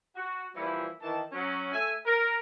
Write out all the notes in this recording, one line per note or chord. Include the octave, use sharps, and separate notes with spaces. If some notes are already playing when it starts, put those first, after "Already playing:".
F#4
A#2 E3 F3 G3 E4
D#3 E3 A5
F#3 C#4
A3 E5 G#5
A#4